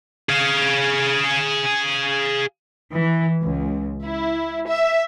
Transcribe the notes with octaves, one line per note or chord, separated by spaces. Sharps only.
G#4 F5
E3
C#2
E4
E5